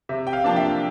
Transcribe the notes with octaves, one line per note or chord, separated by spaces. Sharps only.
C3 E5
G5
F5
F3 A#3 D4 A5
E5 G5